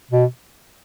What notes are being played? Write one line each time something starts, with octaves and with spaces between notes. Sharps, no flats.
B2